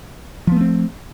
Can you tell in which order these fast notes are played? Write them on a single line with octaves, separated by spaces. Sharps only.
F3 B3 A3 C4